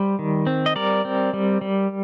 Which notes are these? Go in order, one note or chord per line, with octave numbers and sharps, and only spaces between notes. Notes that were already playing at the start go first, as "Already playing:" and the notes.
Already playing: G3 C5
D#3
C4
D#5
G3 A#4 D5
C4
G3
G3